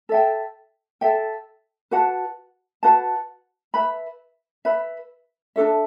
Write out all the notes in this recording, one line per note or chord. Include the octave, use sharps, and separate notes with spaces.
A4 E5 G5
A4 E5 G5
F#4 B4 F#5 A5
F#4 B4 F#5 A5
B4 E5 B5
B4 E5 B5
D4 F#4 A4 E5